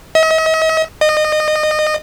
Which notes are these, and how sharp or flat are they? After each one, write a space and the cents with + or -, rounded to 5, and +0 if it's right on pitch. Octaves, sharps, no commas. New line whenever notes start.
D#5 +45
D#5 -25